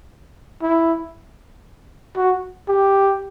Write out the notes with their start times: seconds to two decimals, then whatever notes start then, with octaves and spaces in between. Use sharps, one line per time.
0.62 E4
2.16 F#4
2.68 G4